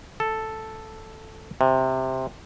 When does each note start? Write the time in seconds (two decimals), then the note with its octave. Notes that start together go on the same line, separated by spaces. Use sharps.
0.20 A4
1.61 C3